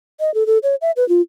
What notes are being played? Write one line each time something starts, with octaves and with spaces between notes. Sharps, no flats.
D#5
A4
A4
C#5
E5
B4
F4